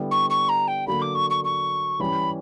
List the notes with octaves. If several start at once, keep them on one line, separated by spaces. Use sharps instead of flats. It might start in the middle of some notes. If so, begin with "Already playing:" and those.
Already playing: D3 G3 B3 E4
C#6
C#6
A#5
G5
D3 F#3 A#3 B5
D6
C#6
C#6
C#6
E3 G3 C#4 B5